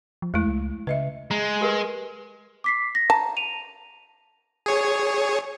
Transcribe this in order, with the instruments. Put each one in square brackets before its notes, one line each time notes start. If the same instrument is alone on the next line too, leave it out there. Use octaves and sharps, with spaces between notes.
[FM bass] F3
[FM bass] E2 [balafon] G#3 A3 E4
[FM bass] C#2
[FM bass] C#3 [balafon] B4 D#5 E5
[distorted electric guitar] G#3 [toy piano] A#5
[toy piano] G4 A#4 B4
[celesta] D6 B6 C7
A#6
[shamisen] A5 [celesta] A#5
[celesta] D#7 F7
[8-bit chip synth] G#4 C#5